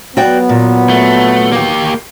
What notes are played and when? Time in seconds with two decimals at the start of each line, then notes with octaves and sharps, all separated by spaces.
0.17 F#3 B3 F#4 D5 G5
0.49 A#2
0.89 A3
1.52 A#3 G4